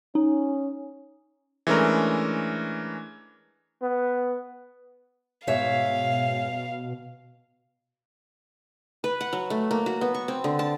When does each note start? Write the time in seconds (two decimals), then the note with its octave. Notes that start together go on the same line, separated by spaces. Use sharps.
0.15 C#4 D#4
1.67 E3 G#3 A3 C#4 D4 A#4
3.82 B3
5.47 G#2 B2 C#5 E5 F5
9.04 B4
9.21 F#5
9.33 F#3
9.50 A3
9.71 A#3
9.86 F#4
10.01 B3
10.14 C#6
10.28 C4
10.44 D3
10.59 A5